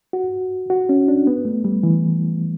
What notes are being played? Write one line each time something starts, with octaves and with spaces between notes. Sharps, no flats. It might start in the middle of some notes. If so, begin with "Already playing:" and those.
F#4
F#4
C#4
D4
B3
A3
G3
E3